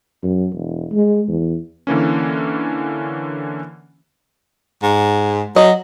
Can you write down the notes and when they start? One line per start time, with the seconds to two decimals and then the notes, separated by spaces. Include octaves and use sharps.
0.23 F#2
0.53 E1
0.91 G#3
1.28 E2
1.87 D3 E3 A#3 C#4
4.82 G#2
5.56 F#3 D#5